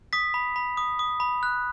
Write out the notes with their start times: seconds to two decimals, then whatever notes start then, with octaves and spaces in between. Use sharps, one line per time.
0.13 D#6 B6
0.34 B5
0.56 B5
0.77 D#6
0.99 D#6
1.20 B5
1.43 F#6